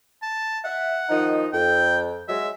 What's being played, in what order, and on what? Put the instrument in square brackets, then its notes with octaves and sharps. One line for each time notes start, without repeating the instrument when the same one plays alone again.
[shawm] A5
[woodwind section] E5 [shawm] F#5
[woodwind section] D#3 F3 D#4
[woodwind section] F2 [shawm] G5
[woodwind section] F#3 G#3 [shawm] E5